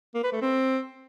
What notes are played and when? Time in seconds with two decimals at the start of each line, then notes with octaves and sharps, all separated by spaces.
0.15 A#3
0.24 B4
0.33 A3
0.41 C4